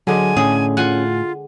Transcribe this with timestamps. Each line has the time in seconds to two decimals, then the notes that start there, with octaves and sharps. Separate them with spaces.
0.07 D3 F#3 G#3 G#5
0.37 A2 C#4 G#4
0.77 F4 F#5 G#5